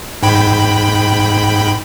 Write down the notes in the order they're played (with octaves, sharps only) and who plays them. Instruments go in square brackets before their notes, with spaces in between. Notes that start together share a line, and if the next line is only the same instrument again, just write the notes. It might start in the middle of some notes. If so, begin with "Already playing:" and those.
[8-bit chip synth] G#2 G5 B5